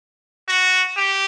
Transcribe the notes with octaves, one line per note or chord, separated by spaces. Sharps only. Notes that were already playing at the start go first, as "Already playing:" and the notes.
F#4
G4